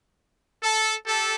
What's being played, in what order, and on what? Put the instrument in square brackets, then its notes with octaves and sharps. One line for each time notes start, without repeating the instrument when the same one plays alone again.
[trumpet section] A4
G4 A4